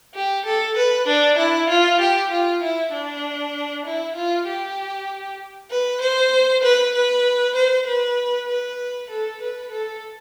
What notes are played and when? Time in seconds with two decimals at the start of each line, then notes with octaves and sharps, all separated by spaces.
0.15 G4
0.46 A4
0.77 B4
1.07 D4
1.38 E4
1.69 F4
2.00 G4
2.31 F4
2.62 E4
2.93 D4
3.86 E4
4.16 F4
4.47 G4
5.71 B4
6.01 C5
6.63 B4
6.95 B4
7.55 C5
7.87 B4
8.48 B4
9.10 A4
9.41 B4
9.72 A4